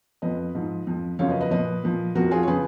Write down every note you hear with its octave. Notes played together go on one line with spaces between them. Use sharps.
F2 F3 B4 D#5
G#2 F3
F2 F3
F#2 C#3 F3 C#5 F5
B4 D#5
B4 D#5
A#2 F3 B4 D#5
A#2 F3
F2 F3 F#4 A#4
F4 G#4
C#5
C#3 F3 G#4 B4